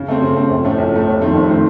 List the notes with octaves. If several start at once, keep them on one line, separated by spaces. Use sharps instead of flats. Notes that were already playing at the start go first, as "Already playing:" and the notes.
Already playing: C#3
A3 C4
C#3
A3 C4
A#1
A2 A3 C#4
A#1
A2 A3 C#4
F1
F2 D#3 A3 C4
F1
D#3 A3 C4